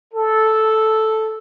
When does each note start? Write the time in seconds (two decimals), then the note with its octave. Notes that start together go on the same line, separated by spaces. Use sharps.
0.13 A4